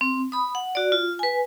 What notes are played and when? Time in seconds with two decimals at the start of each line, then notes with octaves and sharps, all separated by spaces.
0.01 C4
0.32 B5 D#6
0.55 F#5
0.75 F#4 D5
0.92 F4
1.19 B4 G#5